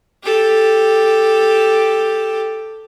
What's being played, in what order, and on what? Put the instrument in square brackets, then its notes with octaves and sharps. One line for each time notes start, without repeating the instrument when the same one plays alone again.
[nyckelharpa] G4 A4